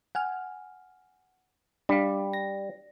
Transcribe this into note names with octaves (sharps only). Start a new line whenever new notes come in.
F#5 G#5 F6
G3 D4 F5
A#6